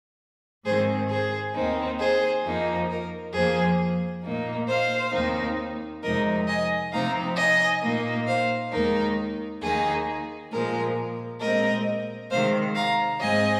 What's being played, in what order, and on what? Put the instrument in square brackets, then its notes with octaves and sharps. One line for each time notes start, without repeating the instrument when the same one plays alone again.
[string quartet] G#2 D#3 C4 G#4 C5
G#4 C5
D#2 D#3 C4 D#4
G#4 C5
F2 F3 A#3 D#4
A#4
F2 F3 A#3 G#4 C5
A#2 A#3 D#4
C5 F5
D#2 D#3 C4 D#4
F2 C3 G#3 D#4 A#4 D#5
D#5 G#5
C3 F3 C4 D#4 F5 A#5
D#5 G#5
A#2 A#3 D#4
C5 F5
D#2 D#3 G#3 D#4 A#4
D#2 D#3 A#3 D#4 G#4
A#2 F3 G#3 A#4
A#2 G#3 C4 A#4 D#5
C3 D#3 G#3 C5 F5
F5 A#5
G#2 G#3 C4 D#5 G#5